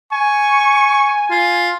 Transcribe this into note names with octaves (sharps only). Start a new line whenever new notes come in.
G#5 C#6
F4